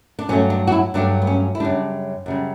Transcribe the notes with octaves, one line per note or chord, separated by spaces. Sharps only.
D4
G2 F#3 A3 C#4
D4
F#4
E4
G2 F#3 A3 D4
B3
C#4
E4
F#2 C#3 G3 D4
F#2 C#3 G3